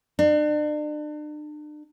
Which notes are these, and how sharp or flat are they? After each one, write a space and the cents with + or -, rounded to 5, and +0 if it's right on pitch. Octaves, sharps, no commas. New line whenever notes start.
D4 +40